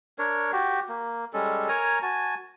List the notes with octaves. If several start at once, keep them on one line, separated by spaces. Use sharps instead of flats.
D4 A#4 C#5
F#4 G4
A#3
G3 G#3 C#4 A4
A#4 C#5 G#5 A#5
F#4 G#5 A5